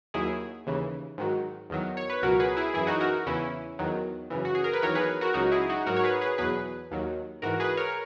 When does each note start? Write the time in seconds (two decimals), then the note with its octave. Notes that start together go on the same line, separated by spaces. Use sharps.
0.14 D#2 D#3 F#3 E4 G#4
0.67 D#2 C#3 E3
1.18 G#2 D#3 F#3
1.70 E2 D#3 F#3
1.97 C#5
2.10 B4
2.22 C#2 B2 F#3 F#4 A#4
2.40 G#4 B4
2.57 E4 G#4
2.74 F#2 E3 E4 G#4
2.87 D#4 F#4
3.01 F#4 A#4
3.27 E2 C#3 E3 C#4 E4
3.79 E2 D#3 F#3
4.30 F#2 C#3 E3
4.45 F#4
4.55 G#4
4.64 A#4
4.73 B4
4.82 E2 D#3 F#3 A#4 C#5
4.95 G#4 B4
5.21 F#4 A#4
5.34 C#2 C#3 F#3 D#4 F#4
5.52 E4 G#4
5.69 D#4 F#4
5.86 G#2 F#3 F#4 A#4
5.96 C#5
6.03 G#4 B4
6.21 G#4 B4
6.38 E2 B2 F#3 G#4 B4
6.91 D#2 D#3 F#3
7.42 G#2 E3 F#4 A#4
7.60 G#4 B4
7.77 A#4 C#5